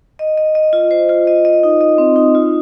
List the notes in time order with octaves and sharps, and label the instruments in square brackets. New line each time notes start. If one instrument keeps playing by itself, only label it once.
[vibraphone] D#5
D#5
D#5
F4
C5
F4
D#5
D#5
D#4
D#5
C4
D#4
F4